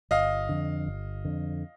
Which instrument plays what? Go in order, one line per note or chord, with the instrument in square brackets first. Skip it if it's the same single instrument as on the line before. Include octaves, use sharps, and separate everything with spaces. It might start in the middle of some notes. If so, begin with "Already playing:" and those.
[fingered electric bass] G1 [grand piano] D#5 F5
[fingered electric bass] F2 D3
G1
F2 D3